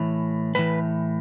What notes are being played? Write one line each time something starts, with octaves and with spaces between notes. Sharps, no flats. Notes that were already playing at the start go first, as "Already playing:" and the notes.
Already playing: A2 E3
A2 E3 B4